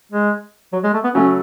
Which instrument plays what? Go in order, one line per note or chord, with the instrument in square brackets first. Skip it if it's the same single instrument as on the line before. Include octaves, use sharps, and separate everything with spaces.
[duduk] G#3
F#3
G#3
A3
B3
[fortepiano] C#3 F#3 A3 [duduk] C#4